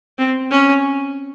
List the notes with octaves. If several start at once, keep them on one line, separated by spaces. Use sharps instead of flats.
C4
C#4